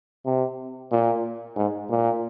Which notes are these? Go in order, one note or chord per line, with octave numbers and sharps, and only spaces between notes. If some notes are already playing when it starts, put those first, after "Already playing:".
C3
A#2
G#2
A#2